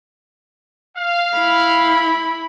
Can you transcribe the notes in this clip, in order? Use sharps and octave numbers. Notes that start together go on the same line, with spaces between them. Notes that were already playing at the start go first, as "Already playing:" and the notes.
F5
E4 B5